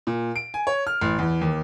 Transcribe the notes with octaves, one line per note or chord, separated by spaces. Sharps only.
A#2
D7
G#5
C#5
F6
A1
E2
D#2